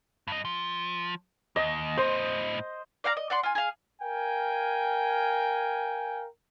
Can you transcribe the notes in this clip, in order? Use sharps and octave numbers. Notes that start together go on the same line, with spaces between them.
G2 D#5
F3
D#2 D#5
A2 C5 D#5
D5 F5 F#5 A#5
D#5
D5 F#5 C6
F4 G#5
G#4 F5
A#4 F5 G5 G#5